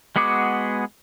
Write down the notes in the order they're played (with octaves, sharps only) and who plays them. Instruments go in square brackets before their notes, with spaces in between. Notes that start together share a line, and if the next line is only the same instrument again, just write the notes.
[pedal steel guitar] G#3 B3 F#4 G#4 D6